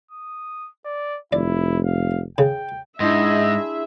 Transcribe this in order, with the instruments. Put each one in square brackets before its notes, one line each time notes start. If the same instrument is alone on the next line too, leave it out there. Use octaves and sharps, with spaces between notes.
[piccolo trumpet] D#6
D5
[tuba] F1 [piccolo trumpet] E4 [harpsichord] D5
[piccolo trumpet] F5
[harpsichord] C#3 [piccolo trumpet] G5
[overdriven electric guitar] G#2 [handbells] D4 E4 C6 [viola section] G#4 E5 [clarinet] D#5